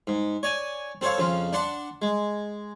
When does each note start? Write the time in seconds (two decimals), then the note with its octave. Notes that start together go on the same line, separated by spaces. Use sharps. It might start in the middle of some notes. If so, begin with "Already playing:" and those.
0.07 G#2
0.43 C#5 D5 G#5
1.01 C4 A4 C5 C#5 F5
1.18 F2 C#3 F4
1.53 D4 F#5 A5 C6
2.02 G#3